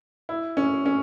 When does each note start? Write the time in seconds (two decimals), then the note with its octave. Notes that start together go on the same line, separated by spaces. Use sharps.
0.29 E4
0.57 C#4
0.86 C#4